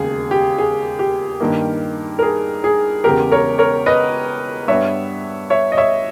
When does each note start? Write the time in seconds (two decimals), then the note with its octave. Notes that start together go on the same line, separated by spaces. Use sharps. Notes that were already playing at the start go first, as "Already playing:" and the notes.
Already playing: E1 D#2 C#3 G#4
0.31 G4
0.58 G#4
0.99 G4
1.41 G2 D#3 A#3
2.19 A#4
2.22 G#4
2.64 G#4
3.04 E1 E2 C#3 G4 A#4
3.32 A#4 C#5
3.58 A#4 C#5
3.86 B4 D#5
4.68 G2 G3 B3 C#5 E5
5.50 C#5 E5
5.72 D#5
5.77 C#5 E5